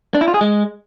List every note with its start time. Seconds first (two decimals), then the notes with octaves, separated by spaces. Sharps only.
0.15 D4
0.21 E4
0.28 F4
0.34 G#4
0.41 G#3